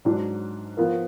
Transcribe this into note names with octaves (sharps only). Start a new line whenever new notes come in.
G#2 F#3 D4
F3 B3 F4 A#4